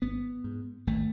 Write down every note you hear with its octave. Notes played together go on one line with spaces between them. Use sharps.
G#1 B3
G#2
G#1 A3